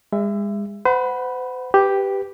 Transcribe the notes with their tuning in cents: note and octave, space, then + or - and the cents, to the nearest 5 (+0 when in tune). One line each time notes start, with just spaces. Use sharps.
G#3 -35 E5 +15
C5 -45 F#5 +0 B5 -10
G4 +0 B4 +5